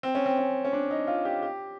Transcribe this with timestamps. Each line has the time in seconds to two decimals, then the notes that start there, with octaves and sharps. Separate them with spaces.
0.03 C4
0.15 C#4
0.26 C4
0.38 C#4
0.65 C#4
0.73 D4
0.91 D#4
1.07 F4
1.25 G4
1.43 G4